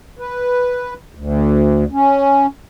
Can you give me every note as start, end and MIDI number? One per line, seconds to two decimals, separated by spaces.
0.19 0.94 71
1.15 1.84 38
1.92 2.46 61